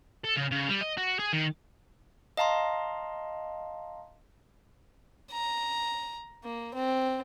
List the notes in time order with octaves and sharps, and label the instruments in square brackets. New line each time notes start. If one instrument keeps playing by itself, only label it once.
[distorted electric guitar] A4
C#3
C#3
G3
D#5
F#4
G#4
D#3
[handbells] D#5 F5 A5 A#5 C6
[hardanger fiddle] A#5
A#3
C4